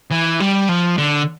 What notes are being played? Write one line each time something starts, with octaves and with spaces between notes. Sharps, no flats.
E3
G3
F3
D3